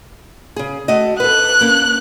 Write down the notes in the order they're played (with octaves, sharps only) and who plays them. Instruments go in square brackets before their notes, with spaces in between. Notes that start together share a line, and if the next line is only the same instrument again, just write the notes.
[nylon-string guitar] C#3 G#4
A3 F#4 D#5
[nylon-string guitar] A4 B4 [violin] F#6
[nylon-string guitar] A#3 C#4